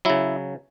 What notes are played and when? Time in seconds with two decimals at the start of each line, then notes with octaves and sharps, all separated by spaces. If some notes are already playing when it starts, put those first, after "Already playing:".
0.05 C#3 F#3 E4